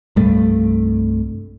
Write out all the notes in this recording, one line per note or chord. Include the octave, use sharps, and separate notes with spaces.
C2 G2 A3